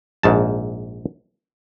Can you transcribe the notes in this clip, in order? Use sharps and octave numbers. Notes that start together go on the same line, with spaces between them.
A#1 G#2 A5